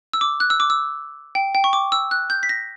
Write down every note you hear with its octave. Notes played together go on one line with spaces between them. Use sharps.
E6
D6
F#6
E6
D6
E6
G5
G5
C#6
D6
E6
F#6
G6
B6
A#6